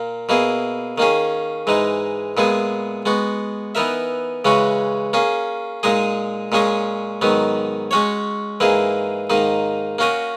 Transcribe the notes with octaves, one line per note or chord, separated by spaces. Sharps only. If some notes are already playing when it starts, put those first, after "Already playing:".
Already playing: A#2 A#3
B2 A#3 E4 G#4
D#3 A#3 C#4 G#4
G#2 E3 G#3 D#4
A#2 G#3 B3 E4 G#4
G#3 B3 F#4
E3 B3 D#4 A#4 E5
C#3 E3 G#3 C#4 F#4
A#3 C#4 G#4
A#2 G#3 D#4 G#4 D#5
A#2 G#3 C#4 G#4 D#5
G#2 D#3 F#3 B3
G#3 C#4 F#4 C#5
G#2 E3 A#3 E4 G#4
G#2 D#3 A#3 D#4
A#3 C#4 F#4 A#4 D#5